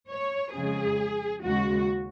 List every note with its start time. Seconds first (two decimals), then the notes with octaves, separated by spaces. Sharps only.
0.10 C#5
0.54 F2 C#3 G#3 G#4
1.43 D#2 C#3 G#3 F#4